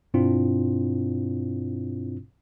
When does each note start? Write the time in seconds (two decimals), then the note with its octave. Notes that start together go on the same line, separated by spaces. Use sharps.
0.14 G2 B2 C4 D4 E4 F4